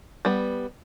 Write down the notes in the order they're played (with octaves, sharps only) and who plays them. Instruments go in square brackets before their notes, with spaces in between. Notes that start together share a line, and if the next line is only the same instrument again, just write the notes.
[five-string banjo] G3 B3